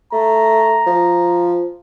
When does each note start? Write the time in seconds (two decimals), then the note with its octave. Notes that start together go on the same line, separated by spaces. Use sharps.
0.13 A3 A#5
0.87 F3